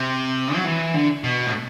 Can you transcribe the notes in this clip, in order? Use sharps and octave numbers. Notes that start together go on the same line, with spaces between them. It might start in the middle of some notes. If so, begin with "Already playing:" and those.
Already playing: C3
F#3
E3
D3
B2
A2